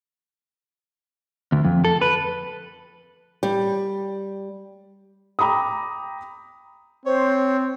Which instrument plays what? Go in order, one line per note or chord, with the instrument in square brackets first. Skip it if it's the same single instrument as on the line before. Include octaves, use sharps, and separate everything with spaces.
[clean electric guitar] D2
F2
A4
B4
[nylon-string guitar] G3
[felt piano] G5 A#5 B5 D6 D#6
[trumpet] C4 [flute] C5 [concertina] C#5